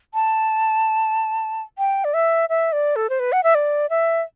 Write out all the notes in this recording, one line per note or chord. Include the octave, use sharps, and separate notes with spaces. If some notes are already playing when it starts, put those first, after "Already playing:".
A5
G5
D5
E5
E5
D5
A4
C5
B4
F#5
E5
D5
E5